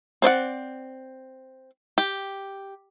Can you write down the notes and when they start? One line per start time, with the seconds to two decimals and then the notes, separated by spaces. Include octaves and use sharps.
0.22 C4 C5 D5 F#5
1.98 G4